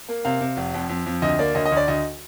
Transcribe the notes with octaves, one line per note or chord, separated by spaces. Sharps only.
A#3
C3 F5
C3
F1
F2
F2
F2
D2 D#5
A#3 D5
D2 D#5
D#5
D2
D5
D2 D#5